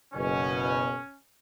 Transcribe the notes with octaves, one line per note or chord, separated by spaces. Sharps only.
F#1 B2 C#4